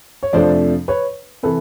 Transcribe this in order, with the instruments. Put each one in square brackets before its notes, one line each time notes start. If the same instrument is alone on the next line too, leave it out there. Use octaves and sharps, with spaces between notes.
[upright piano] C#5
F2 C3 F3 A3 D4 C5 D5
B4 C#5
C3 E3 A4 B4